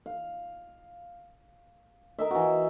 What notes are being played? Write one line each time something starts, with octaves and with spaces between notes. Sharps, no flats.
F5
A#4 D#5 E5
E3 F#4